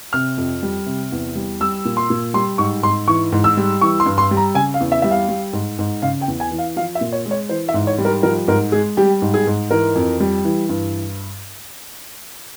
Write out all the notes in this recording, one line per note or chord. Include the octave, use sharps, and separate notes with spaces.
C3 F6
F2
G3
C3
E2
G3
G3 E6
A#2
C6
A#2
G3 C6
G#2 C#6
G#2 C6
E3 C#6
G#2
E6
G3
E3 C#6
C6
G2
C6
G3
A#5
C#3 G#5
F5
E2
E5
G3 E5
F5
G3
G#2
G#2
C#3 F5
G5
E2
G#5
E3
F5
F3 F5
E5
A#2
C#5
G#3
C#5
E3 C5
E5
G#2
C#5
G3
A#4
F3 A#4
G#2 A#4
G#3 G#4
G3 G4
G#2
G#4
G#2
E3 A#4
F2
G3
E3
G2